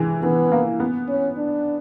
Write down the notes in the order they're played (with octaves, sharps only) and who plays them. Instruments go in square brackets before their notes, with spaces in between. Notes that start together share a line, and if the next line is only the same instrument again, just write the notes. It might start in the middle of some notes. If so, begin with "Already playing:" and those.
Already playing: [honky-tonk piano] E3 G#3
[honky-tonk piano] E3 [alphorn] B3
[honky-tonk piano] A#3
B3
[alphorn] C#4
D4